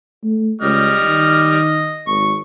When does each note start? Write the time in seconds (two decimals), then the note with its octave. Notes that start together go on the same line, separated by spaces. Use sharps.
0.23 A3
0.61 C#2 G3 D#5 F6
1.02 D#3
2.07 G#1 C#6